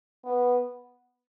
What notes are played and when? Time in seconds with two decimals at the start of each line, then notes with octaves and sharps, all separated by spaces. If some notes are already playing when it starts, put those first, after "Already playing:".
0.25 B3